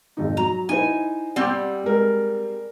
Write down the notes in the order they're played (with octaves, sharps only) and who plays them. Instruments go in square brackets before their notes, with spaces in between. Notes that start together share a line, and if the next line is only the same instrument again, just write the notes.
[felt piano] G#1 F2 D#4
[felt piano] F#3 [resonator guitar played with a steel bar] A#5
[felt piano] D#4 E4 C5 [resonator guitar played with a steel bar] G#5
[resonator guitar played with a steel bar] G3 C4 [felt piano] F#5 D6
[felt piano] G#3 A#4